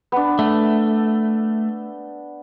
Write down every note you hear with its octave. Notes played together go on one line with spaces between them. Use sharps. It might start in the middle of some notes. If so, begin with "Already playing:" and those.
B3 D4
A3